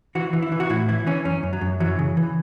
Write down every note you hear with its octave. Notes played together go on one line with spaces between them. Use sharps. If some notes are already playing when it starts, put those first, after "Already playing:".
E3 F#4
E3
E4
E3
F#4
A2 E4
E3 E4
E3 C#4
F#2 C#4
F#2
F#3
F#2
E3 F#3
C#3
E3